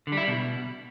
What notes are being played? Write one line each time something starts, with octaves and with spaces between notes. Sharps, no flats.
D3
G3
E4
G3
B2